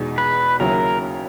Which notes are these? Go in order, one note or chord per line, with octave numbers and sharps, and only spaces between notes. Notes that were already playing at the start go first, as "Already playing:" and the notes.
Already playing: E2 B2 G#3 D#4
B4
D#2 C#3 F#3 C#4 E4 A#4